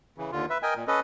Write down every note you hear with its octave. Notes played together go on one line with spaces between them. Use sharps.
C#3 E3
D#2 D3 F4
B4 E5
A#4 D#5 G5 G#5
A#2
C#4 A4 B4 D#5